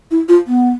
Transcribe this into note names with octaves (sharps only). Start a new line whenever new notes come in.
E4
F4
B3